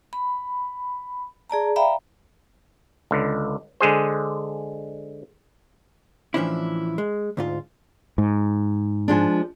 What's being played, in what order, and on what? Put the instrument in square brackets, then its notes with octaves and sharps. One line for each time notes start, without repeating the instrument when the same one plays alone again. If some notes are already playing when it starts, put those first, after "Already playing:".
[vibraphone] B5
G#4 D5 A5 A#5
D5 E5 F5 G5 A#5 B5
[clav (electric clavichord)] C#2 D3
D3 G#3 G#4 C5
[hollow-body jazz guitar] A2 E3 F3 C#4 D4 E4
G#3
D2 G#2 F4
[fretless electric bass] G#2
[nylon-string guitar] F3 G#3 D4